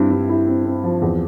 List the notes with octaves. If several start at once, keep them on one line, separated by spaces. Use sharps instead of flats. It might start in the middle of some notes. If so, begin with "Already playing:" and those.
Already playing: G2 C4 E4
G2
E4
C4
C4
F3
E2